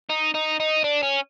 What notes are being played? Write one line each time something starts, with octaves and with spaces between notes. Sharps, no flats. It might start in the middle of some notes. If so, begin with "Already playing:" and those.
D#4
D#4
D#4
D4
C#4